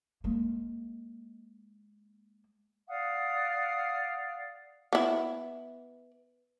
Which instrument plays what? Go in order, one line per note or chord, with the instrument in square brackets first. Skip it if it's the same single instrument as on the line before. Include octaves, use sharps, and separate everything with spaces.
[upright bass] G#3 A#3
[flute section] D5 F5 F#5 D#6
[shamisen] B3 E4